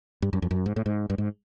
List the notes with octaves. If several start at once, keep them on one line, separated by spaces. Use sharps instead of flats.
G2
F#2
F2
F#2
G#2
A2
G#2
G2
G#2